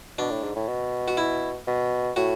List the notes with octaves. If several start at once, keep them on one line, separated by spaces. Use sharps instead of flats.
B2 D4
A2
G#2
A2
B2
F#4
E4
B2
A2 F#4